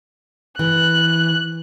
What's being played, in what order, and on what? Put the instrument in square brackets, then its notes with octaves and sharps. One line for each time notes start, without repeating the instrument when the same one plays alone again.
[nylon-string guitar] E3 [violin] F#6